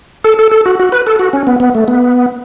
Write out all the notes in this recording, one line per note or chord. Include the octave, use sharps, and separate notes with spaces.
A4
A4
A4
F#4
F#4
B4
A4
F#4
C#4
B3
B3
A3
B3